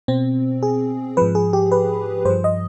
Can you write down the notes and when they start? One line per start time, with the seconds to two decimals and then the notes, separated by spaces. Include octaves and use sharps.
0.08 B2 C4
0.63 G#4
1.17 G#2 F3 B4
1.35 G#4
1.53 G4
1.72 B4
2.25 G2 C5
2.30 F3
2.44 D#5